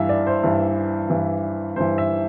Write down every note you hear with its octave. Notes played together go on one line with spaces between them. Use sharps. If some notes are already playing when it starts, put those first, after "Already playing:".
Already playing: G2 E3 E5 F5
D5
C5
G2 E3
G2 E3
G2 E3 C5
E5